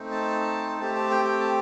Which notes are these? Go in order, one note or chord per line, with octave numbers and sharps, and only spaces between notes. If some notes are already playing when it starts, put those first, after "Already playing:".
Already playing: A3 C4 D#4
A5
A3 C4 G4 A5
A5
G5
G5
A5